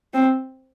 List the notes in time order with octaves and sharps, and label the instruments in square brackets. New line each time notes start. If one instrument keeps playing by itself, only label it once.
[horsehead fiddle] C4